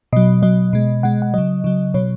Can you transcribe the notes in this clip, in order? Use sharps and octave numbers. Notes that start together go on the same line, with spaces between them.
B2 F#3 D#5
B2 F#3 D#5
B2 G#3
B2 G#3 F#5
F#5
C#3 F#3 D#5
C#3 F#3
B2 F#3 C#5